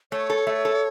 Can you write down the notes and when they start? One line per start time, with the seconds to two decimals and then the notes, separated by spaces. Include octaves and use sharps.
0.12 A3 C#5
0.30 A4
0.47 A3
0.65 A4